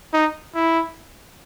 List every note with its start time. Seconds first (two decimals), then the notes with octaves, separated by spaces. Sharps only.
0.13 D#4
0.55 E4